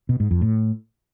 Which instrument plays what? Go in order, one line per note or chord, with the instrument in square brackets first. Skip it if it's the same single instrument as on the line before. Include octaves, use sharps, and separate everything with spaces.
[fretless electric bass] B2
G#2
F2
A2